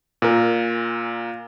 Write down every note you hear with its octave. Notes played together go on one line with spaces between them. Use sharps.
A#2 A#4